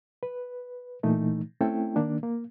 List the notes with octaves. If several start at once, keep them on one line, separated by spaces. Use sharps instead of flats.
B4
A#2 E3 A3 D#4
A3 C4 C#4 E4 A4 G5
D#3 A#3 D4
A#3